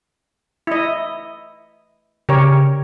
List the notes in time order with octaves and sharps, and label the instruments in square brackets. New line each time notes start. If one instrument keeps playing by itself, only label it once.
[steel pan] E4 D#5
[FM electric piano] C#3 [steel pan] G4 A#4 C#5